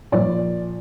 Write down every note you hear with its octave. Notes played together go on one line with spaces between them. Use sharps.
A#2 F3 D5